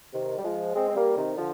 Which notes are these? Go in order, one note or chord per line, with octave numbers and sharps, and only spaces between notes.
C3 D#3
G3
F3 G#3
G#3 C4
C4
G3 A#3
C3 D#3
D3 F3